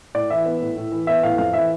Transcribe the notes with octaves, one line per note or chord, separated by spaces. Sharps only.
A2 D5
E3 E5
B3
A2
A2
E3
B3 E5
A2 F5
F2 F5
E3 E5